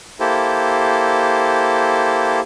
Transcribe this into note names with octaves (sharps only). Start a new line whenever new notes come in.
A#3 E4 G4 A4 C5